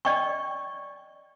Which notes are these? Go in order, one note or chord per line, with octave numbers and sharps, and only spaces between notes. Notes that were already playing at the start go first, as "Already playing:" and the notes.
D5 D#5 G5 C#6